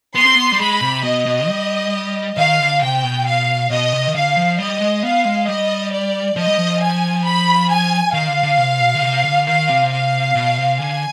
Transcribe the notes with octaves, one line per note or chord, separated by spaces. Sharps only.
B3 C6
C4
B3
G3
G#3 B5
C3
B2 D#5
B2
G3
D#3 F5
D3
C3 G5
B2
F5
B2 D#5
C3
D#3
D3 F5
F3
G3 D#5
G#3
B3 F5
G#3
G3 D#5
D5
F3 D#5
G3
F3
G#5
B5
G#5
D#3 F5
D3
D3
C3
B2
D3
C3
D3
D#3 F5
C3
F5
B2
C3
D3 G#5